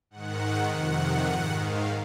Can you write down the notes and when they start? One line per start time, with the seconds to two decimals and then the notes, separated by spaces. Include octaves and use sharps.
0.10 G#2 D#3 F#5
0.71 F2 C3 D#3 F#5
1.31 G#2 D#3
1.62 F5